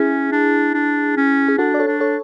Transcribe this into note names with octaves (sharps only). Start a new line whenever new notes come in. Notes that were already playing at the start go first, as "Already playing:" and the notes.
Already playing: C#4 E4 G#4
D4
D4
C#4
G#4
D4 F#4 A4
D5
A4 C#5
D4
A4 C#5